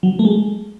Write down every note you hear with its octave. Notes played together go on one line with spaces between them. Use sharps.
F#3
A3
G#3